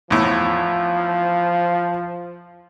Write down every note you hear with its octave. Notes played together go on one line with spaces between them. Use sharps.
E2 A2 F3